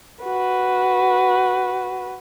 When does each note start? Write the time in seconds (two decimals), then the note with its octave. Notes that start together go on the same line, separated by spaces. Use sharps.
0.24 F#4 B4